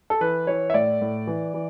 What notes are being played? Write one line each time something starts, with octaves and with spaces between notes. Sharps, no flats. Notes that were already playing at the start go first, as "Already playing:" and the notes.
A4
E3 B4
E3 C#5
E5
A2 D5
A2
E3
E3